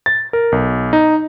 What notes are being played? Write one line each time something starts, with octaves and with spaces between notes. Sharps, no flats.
A6
A#4
B1
D#4